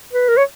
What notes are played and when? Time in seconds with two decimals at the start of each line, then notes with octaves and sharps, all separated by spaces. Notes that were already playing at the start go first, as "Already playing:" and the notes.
0.14 B4
0.28 A#4
0.37 C#5